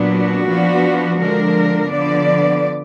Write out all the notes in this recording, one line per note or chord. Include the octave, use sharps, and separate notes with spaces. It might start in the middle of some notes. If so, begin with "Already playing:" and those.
Already playing: A#2 F#3 B3 D4
F#4
F3 B3 D4
D3 F3 G#3 D4 A#4
D3 F3 B3 D5